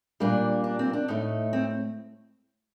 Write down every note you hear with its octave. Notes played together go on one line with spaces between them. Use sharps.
A#2 G3 A#3 D4
D4
C4
D4
A2 A3 D#4
C4